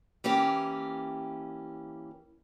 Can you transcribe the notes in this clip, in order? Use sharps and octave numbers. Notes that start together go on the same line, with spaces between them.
E3 A#3 C#4 G4